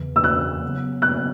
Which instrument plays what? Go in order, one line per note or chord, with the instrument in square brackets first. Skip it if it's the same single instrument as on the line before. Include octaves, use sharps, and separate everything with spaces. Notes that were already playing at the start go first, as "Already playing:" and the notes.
Already playing: [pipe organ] E2 C#3 E3
[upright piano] E6
F#6
[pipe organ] C#3 F#3 B3
[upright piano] F#6